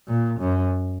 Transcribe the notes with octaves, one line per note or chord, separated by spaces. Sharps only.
A#2
F#2